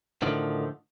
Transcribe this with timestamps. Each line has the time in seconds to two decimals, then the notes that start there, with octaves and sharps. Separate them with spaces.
0.22 A2 D3 D#3 F3